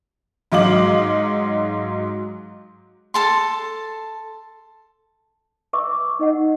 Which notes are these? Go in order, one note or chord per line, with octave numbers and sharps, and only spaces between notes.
G#2 F#3 D#5 F5 D6 F#7
A4 A5 C6
B4 E5 C#6 D6 E6
D#4 D#5 F#5